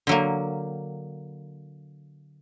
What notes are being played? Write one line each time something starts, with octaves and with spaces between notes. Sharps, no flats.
D3 F#3 A#3